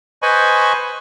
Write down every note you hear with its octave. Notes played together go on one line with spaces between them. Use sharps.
B4 C5 D#5 G#5 B5 C#6